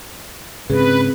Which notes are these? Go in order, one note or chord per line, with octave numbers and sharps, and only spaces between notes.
G#2 C#3 C4 G#4 B4